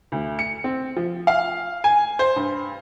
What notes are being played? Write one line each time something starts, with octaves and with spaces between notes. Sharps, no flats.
D2
C#7
C4
F3
F5
G#5
C5
G2